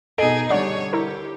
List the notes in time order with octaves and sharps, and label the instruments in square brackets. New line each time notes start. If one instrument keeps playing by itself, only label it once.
[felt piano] B2 D7 [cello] D#4 G#4 [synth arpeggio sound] A4 D#5
[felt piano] D3 G3 [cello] C#5 [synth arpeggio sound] D5 F#5 C#6
[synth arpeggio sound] E4 A#4 [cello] G4